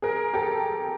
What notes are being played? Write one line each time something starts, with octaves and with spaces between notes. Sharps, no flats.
G#4 A#4
G4 A4